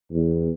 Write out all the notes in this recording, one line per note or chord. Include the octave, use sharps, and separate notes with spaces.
E2